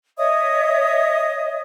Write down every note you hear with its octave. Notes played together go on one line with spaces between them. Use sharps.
C#5 D#5 E5 D#6